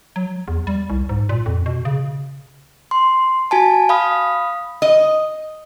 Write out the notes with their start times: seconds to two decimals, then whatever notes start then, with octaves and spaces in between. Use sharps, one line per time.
0.16 F#3
0.48 E2
0.67 G3
0.90 C2
1.09 G#2
1.29 A#2
1.46 F2
1.66 B2
1.85 C#3
2.91 C6
3.51 F#4 G#5 A5
3.89 F5 B5 D#6
4.82 D#5